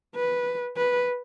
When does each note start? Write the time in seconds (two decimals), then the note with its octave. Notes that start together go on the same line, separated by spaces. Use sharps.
0.15 B4
0.77 B4